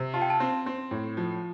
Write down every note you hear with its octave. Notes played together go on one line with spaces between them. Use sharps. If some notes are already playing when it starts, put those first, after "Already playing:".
Already playing: C3
F4 A5
G5
A5
C4
C4
A2
F3